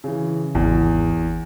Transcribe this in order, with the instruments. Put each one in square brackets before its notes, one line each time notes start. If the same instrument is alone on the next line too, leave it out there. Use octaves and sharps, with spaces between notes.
[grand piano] C#3 E3
[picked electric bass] G#1 [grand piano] E2